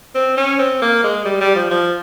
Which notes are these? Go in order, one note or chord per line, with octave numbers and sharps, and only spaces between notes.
C4
C#4
C4
A#3
G#3
G3
G3
F3
F3